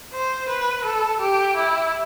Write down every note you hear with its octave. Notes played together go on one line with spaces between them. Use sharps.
C5
B4
A4
G4
E4